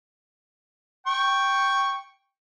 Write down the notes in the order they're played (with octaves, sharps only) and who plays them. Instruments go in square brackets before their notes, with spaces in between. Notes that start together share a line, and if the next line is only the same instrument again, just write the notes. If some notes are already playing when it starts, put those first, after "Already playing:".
[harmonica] G5 C#6